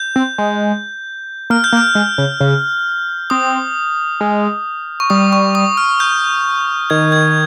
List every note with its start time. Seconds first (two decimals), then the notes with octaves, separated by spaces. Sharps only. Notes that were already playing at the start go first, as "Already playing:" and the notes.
Already playing: G6
0.16 C4
0.38 G#3
1.50 A#3 F6
1.64 G6
1.72 A#3
1.77 F6
1.95 G#3
2.18 C#3
2.40 C#3
3.30 C4 D#6
4.20 G#3
5.00 C#6
5.10 G3 D#6
5.33 C#6
5.55 D#6
5.77 F6
6.00 G6
6.90 D#3 G#6
7.12 G#6